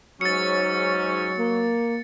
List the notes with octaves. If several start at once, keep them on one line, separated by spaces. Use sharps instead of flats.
G#2 F#3 C#4 A6 C#7
A#3